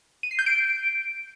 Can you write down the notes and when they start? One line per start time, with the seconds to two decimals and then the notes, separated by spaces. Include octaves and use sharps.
0.23 D#7
0.31 C7
0.39 G6
0.46 D7